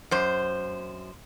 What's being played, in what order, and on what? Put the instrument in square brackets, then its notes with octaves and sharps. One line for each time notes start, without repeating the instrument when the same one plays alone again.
[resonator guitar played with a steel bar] F#2 C5